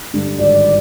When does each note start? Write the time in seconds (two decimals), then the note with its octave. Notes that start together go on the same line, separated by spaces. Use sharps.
0.14 G2 D3
0.39 G#1 D5